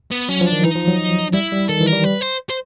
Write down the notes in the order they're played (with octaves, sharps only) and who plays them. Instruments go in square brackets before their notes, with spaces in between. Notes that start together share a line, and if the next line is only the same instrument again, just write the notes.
[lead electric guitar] B3
[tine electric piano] F#3 [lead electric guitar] C#4
[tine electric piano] F3
[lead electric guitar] D4
[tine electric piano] D#3
[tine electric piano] E3 [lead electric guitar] D#4
[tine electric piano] F3
F#3
[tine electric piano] G3 [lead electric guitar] E4
[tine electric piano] G3
[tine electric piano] D#3 [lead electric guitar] A4
[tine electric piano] E3
[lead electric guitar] A#4
[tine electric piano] G3
[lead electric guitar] B4
C5
C5